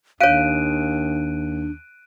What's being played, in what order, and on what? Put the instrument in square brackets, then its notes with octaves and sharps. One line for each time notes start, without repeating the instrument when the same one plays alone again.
[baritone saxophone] D#2 [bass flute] D4 [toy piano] C#5 F5 [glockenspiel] F#6 D7 D#7